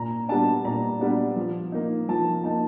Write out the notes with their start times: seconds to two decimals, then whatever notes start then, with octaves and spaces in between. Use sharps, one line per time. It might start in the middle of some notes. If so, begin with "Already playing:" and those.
Already playing: A#2 A#5
0.28 G3 B3 D4 A5
0.65 A#2 A#5
1.01 G3 B3 D4
1.36 F3
1.72 A#3 D#4
2.08 F3 A5
2.44 A#3 D#4 A5